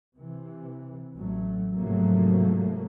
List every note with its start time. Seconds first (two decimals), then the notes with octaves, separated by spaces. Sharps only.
0.17 C3 E3
1.16 A1 F#3 A3
1.74 G#2 C3 F3 F#3 A3 A#3